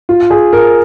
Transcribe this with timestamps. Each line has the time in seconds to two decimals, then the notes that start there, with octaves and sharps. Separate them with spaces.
0.09 F4
0.30 G#4
0.53 A#4